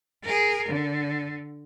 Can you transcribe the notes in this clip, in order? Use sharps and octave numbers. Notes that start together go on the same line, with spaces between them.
G#4 A#4
D3